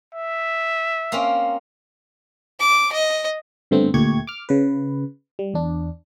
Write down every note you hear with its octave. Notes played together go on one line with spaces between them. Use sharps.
E5
A#3 C4 C#4
D6
D#5
G2 D3 A3 B3 C4
D2 A#2 A3 G4 C#6 G#6
D6 F6
C#3 B4
G3
E2 D4